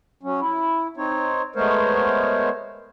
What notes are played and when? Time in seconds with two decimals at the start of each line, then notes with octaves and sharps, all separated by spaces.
0.23 F#3 C#4
0.41 E4
0.97 C4 D#4 C#5
1.56 G#3 A3 B3 A#4 C5 C#5